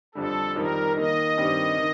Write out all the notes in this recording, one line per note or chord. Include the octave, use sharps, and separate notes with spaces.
F2 D3 G3 A4
F2 D#3 G3 A#4
D#2 D#3 A#3 D#5
G2 D#3 G3 C4 G4
D#3